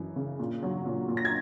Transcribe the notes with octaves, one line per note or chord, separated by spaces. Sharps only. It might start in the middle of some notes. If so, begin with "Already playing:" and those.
Already playing: F#2 E3
C#3
A#2
F#3
A#2
A#2
A#6
G#6